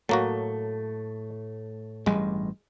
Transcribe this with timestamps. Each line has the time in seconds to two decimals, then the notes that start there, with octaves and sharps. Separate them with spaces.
0.09 A2 F#3 A3 A#3 F#4
2.06 A1 G2 G3 G#3